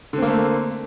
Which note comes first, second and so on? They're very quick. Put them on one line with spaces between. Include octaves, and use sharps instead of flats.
D3 C4 A#3 A3